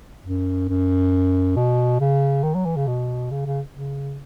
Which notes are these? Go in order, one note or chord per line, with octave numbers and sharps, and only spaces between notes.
F#2
F#2
B2
C#3
D#3
F#3
E3
C#3
B2
C#3
C#3
C#3